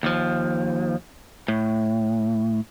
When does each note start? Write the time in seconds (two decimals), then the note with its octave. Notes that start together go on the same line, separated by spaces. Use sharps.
0.03 D#2 F3
1.48 A2